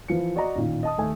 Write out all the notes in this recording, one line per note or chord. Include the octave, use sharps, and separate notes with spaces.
E3 F3 C#7
F#4 D5 D#5 A#5
A1 A#2 D#3
D#5 A5 D#6
D#2 A3 G#5